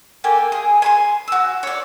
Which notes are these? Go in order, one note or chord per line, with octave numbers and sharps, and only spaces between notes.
A#3 G4 A4 G#5
G#4
G#5 B5 C6
F#4 E6
C#5 D5